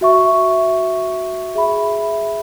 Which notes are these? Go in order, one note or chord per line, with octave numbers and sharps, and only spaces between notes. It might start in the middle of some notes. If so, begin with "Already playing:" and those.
F#4 E5 C#6
G#4 E5 B5